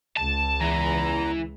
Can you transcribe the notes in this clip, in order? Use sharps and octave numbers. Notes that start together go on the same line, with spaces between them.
C#2 A5
E2 E3 A#5